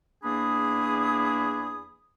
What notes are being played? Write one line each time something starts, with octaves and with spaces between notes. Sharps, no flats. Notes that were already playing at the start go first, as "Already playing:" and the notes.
E2 A#3 D4 G#4 B5 D#6